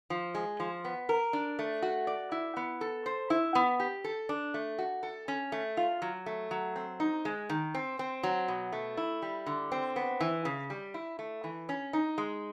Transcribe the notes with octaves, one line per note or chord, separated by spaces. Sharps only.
F3
G#3
F3
B3
A#4
D4
A3
F#4
D5
E4
B3
A4
C5
E4
B3
G4
A4
D4
A3
F#4
A4
C#4
A3
F4
F#3
A3
F#3
C4
D#4
G#3
D#3
C4
C4
F#3
B2
A3
E4
G3
D3
C4
B3
E3
C#3
G3
E4
A3
E3
C#4
D#4
G#3